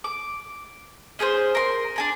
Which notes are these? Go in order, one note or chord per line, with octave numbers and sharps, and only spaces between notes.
D6
C#4 G#4 A#4 C5
A#4 C6
D4 G#5 A#5